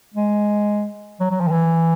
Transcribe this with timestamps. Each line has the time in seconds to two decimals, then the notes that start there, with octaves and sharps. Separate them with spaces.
0.14 G#3
1.20 F#3
1.31 F#3
1.41 F3
1.48 D#3
1.52 E3